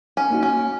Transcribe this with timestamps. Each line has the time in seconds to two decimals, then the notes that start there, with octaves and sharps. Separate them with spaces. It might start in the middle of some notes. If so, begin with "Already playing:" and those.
0.17 C#4
0.30 A#3 D#4 F#4
0.43 C#4